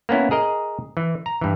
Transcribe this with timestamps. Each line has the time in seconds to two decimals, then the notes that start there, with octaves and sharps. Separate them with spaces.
0.09 A#3 B3 C#4 E4
0.31 G#4 A#4 D#5
0.97 E3
1.26 A#5
1.41 G2 E3